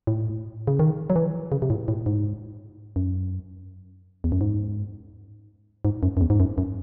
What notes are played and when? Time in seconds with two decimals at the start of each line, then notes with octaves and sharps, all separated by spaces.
0.07 A2
0.67 C#3
0.79 D#3
1.10 F#3
1.16 E3
1.52 C#3
1.62 C3
1.70 A2
1.88 A2
2.06 G#2
2.96 F#2
4.24 E2
4.32 F#2
4.41 G#2
5.85 G#2
6.03 F#2
6.17 F#2
6.21 E2
6.30 G#2
6.40 F#2
6.58 F#2